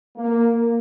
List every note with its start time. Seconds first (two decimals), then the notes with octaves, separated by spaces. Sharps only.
0.17 A#3